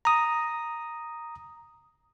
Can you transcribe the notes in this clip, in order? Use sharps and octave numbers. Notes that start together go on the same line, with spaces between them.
A#5 D#6